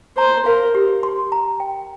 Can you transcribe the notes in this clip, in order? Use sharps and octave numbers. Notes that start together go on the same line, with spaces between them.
C5 A#5
A#4 F5
G4
C6
A#5
G5